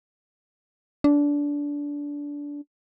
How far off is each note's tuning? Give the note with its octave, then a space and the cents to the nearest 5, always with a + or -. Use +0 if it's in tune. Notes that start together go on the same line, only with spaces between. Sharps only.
D4 -20